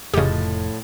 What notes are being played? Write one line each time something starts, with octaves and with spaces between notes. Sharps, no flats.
F1 A2 C#3 F3 G4 D#5